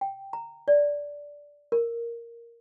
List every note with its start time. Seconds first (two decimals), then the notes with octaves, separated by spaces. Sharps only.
0.01 G5
0.33 A#5
0.68 D5
1.72 A#4